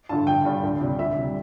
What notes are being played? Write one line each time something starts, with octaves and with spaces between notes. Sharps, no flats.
G2 D3 A5
G1 G5
G2 D3 G3
D2
C3 G3
D2 E5
C3 G3